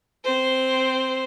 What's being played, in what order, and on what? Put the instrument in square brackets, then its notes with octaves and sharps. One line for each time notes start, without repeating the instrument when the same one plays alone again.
[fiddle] C4 C5